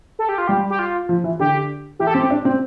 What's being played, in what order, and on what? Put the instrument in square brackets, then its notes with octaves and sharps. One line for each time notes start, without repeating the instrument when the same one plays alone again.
[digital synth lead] A4
G4
F4
[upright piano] G3 [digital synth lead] G4
[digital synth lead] G4
F4
[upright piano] F3
E3
[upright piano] D3 [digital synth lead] G4
[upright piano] E3 [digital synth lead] G4
[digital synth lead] A4
[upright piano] C4 [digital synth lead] G4
[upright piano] D4
C4